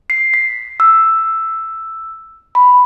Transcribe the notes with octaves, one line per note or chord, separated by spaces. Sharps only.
C7
B6
E6
B5